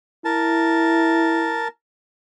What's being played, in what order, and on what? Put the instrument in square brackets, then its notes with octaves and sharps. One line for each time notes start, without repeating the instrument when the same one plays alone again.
[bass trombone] E4 [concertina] A#4 A5